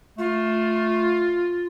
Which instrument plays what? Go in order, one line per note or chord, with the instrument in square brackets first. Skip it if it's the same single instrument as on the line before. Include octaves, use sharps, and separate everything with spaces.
[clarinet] A3 [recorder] F4